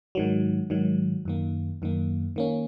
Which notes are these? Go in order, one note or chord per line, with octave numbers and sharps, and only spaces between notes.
G#2 D#3 F#3
G#2 D#3 F#3
F#2 D#3 A#3
F#2 D#3 A#3
D#3 A#3 C#4